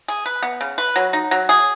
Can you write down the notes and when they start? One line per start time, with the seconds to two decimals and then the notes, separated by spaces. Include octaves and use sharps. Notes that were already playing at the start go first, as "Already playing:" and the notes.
0.08 G#4
0.26 B4
0.43 B3
0.61 C#3
0.78 B4
0.96 F#3
1.13 D#4
1.31 F#3
1.49 G#4